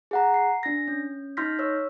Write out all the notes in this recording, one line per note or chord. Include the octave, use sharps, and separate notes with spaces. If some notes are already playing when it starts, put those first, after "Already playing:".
G#4 F#5 A#5
C7
D4 A#6
C#4
D#4 C6 F6 G6 A#6 B6
C#5 E6